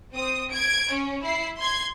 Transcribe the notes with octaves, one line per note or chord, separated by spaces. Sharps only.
C4 D#6
G#6 D7
C#4
E4 C7
C6 G#6